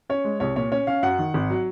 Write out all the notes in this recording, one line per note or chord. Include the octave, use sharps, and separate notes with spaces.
C#4 C#5
G#3
C2 C#5
A#2 C#5
C#4 C#5
C#4 F5
F#2 F#5
D#3
G#1
F#3